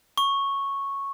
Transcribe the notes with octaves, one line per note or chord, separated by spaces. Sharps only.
C#6